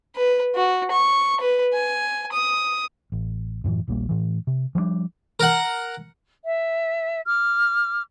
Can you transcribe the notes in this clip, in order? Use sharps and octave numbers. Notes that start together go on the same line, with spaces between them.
B4
F#4
C#6
B4
G#5
D#6
A1
F#2 A2 D3 E3
D#1 A#1 G3 A#3
A2 E3
C3
F3 G3 G#3 D4
A#4 F#5
E5
D6 F6